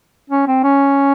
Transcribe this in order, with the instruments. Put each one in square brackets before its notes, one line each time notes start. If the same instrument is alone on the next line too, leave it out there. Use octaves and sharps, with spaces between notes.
[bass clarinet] C#4
C4
C#4